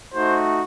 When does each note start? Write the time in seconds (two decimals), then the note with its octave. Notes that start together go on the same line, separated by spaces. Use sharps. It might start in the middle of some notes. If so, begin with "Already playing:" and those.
0.13 A3 D#4 F#4 C5